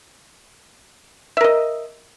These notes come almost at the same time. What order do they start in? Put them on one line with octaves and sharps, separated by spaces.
E5 A#4 D#5